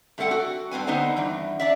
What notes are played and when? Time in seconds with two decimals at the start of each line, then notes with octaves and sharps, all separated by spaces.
0.18 G2 A3 C4 A4 F#5 G5
0.31 F#4
0.71 G2 C4 B4 G#5
0.87 D3 B3 C4 D#4 C5 F#5
1.17 G2 E3
1.60 D4 D5 E5